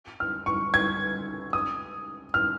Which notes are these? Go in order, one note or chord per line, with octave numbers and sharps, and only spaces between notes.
F6
C#6
G#6
D#6
F6